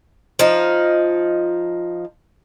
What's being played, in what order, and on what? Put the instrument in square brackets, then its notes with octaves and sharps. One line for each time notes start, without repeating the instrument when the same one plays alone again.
[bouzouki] F3 D#4